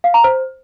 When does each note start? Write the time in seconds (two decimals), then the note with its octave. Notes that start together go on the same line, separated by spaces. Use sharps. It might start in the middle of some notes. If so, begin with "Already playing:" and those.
0.04 F5
0.14 A#5
0.24 C5